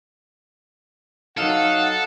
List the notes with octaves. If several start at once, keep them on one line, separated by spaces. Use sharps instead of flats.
F#3 D#4 A4 F5 F#5